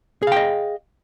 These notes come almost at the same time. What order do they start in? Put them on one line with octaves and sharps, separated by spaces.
G#4 F5 G5 D#5